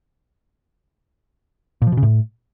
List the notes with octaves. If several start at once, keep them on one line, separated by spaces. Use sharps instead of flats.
A#2
F3
B2
C#3
A2